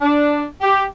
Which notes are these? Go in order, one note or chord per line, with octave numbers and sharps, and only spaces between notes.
D4
G4